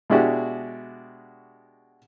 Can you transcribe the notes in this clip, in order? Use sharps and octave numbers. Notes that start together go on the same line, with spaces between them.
B2 G#3 D4 E4 F#4 G4